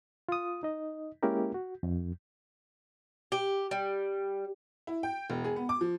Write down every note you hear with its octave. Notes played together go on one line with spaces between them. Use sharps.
F4 D#6
D#4 D#5
G#3 A#3 C#4 E4 G4 A#4
F#4
F2
G4
G3
E4
G5
E1
G#4
B3
D6
F3